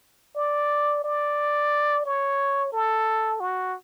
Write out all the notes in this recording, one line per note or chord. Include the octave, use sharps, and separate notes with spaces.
D5
D5
C#5
A4
F#4